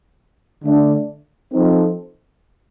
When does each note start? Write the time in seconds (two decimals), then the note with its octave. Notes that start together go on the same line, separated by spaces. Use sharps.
0.62 D3 A3 D4
1.52 F3 C4 D#4 A4 C5